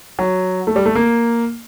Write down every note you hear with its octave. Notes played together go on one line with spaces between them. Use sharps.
F#3
A3
G3
A3
A#3